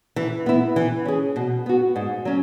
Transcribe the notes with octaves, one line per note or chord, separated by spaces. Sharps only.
E3
B3 E4
E3
C#4 G#4
B2
B3 F#4
G#2
F#3 C#4